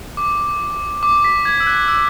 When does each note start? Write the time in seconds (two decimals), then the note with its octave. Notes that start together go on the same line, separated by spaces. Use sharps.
0.17 D6
1.03 D6
1.24 B6
1.45 G#6
1.60 E6
1.67 F#6
1.88 E6